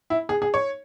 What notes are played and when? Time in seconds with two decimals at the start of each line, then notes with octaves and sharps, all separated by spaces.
0.10 E4
0.29 G#4
0.42 G#4
0.54 C#5